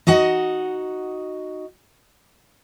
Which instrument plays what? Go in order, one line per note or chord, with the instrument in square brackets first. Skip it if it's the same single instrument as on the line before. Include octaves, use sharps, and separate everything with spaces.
[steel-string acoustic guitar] D#4 F#4 D#5 F#5